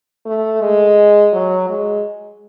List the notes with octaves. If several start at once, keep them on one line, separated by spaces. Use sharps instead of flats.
A3
G#3
F#3
G#3